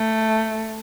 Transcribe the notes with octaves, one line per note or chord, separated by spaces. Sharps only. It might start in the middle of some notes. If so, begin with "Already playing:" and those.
Already playing: A3